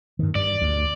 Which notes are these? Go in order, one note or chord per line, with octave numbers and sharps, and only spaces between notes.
G2 D#3
G2 D5
D2